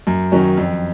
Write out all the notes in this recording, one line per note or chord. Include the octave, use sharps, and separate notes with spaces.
F#2
D#3 F#3 C#4
F2